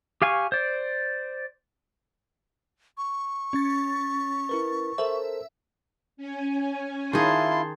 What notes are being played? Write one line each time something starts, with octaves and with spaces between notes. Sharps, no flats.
G4 F5 G#5 C#6
C5 D5
C#6
C#4 A6
E4 A#4 B4
A4 A#4 C5 E5
C#4 G#5
D#3 E4 F4 G#4 A5 C6